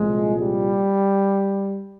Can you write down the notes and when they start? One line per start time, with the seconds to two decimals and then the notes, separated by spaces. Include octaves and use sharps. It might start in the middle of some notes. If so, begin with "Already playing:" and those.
Already playing: C2 A#2 F3 G#3
0.42 G3